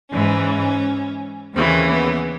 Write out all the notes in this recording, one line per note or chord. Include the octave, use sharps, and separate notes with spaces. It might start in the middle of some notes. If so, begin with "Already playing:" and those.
G#2 E3 C#4
D#2 C#3 E3 C4
B3